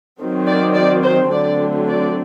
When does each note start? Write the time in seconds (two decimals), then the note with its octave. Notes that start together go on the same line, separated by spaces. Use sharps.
0.20 D#3 F#3 C4
0.47 D5
0.75 D5
1.04 C5
1.31 D3 F#3 A3 C4 D5
1.88 D5